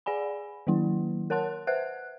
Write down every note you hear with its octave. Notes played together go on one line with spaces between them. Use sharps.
G#4 D5 F#5 G#5 B5
D#3 F#3 A#3 E4
A#4 C#5 F#5 A5 C6 F#6
B4 C5 E5 F#5 F#6